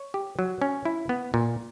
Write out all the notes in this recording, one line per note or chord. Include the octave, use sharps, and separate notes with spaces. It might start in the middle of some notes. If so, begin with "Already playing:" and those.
Already playing: C#5
G4
F#3
C#4
E4
B3
A#2